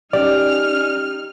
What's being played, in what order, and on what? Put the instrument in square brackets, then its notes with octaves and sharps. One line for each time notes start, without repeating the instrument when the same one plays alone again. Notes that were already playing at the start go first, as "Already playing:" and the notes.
[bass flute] C#4 [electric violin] D#4 F6 [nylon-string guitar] G4 [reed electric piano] D5